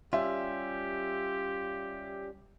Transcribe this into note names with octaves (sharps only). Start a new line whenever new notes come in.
G3 C#4 F4 G4 E5